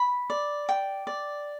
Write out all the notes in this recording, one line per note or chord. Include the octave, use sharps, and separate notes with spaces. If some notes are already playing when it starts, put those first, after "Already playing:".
Already playing: B5
D5
G5
D5